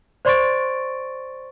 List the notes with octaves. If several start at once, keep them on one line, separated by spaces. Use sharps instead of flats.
C5 D5 C6 C#6 A6 D7